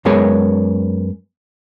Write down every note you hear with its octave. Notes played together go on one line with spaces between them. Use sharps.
F#2 G#3 B3 G#4 A#4 C#5